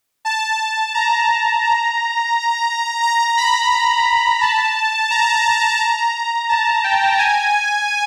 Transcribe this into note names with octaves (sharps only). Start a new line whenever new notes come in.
A5
A#5
A#5
A#5
B5
A#5
A5
A#5
A5
G5
G#5